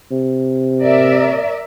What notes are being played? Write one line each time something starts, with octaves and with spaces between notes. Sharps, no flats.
C3
A#4 D5 E5